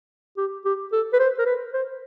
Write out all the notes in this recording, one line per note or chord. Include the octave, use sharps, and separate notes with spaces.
G4
G4
A4
B4
C5
A#4
B4
C5